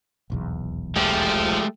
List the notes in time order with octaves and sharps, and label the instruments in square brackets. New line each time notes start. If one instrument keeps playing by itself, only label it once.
[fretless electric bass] D#1 B1 E2
[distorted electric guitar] F3 [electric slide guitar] G#3 A3 G4